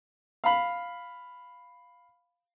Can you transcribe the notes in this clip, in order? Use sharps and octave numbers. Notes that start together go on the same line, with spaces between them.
F5 B5